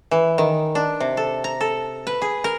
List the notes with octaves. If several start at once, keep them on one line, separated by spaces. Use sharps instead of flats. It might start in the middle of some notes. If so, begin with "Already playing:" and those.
E3
D#3
D4
C3
A4
A#5
A4
B4
G#4
A#4